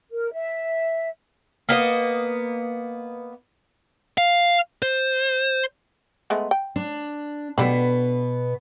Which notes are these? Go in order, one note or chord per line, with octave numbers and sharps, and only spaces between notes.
A#4
E5
A#3 B3 D#5
F5
C5
G#3 A3 B3
G5
D4
B2 D3 B3 G4 B5